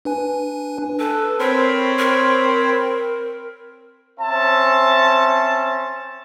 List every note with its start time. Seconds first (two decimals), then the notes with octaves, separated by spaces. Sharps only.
0.05 D4 B4 G#5
0.99 A4 B4
1.39 C4 A#4 C5 C#5 B5
1.99 A#4
4.19 C4 C#4 E5 A5